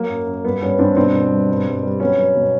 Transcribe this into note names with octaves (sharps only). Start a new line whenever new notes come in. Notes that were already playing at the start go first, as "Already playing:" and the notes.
Already playing: F#3 A#3
F#2
F#2
G2 B3
G2 B3 C#4
G2 C4 D4
B2 C4 D4
B2
G3
G2
G2
G3
F#3 B3 C#4
F#3
B2